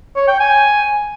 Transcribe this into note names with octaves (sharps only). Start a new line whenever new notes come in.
C#5
G5
G#5